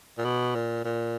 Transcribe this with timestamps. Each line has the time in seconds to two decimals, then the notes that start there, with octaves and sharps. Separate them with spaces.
0.18 A#2
0.25 B2
0.55 A#2
0.85 A#2